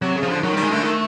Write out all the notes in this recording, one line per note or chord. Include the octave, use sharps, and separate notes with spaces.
C3 F#3
C#3
F3
D3
D#3 F#3
G3
D#3
G#3
D3 A3
D#3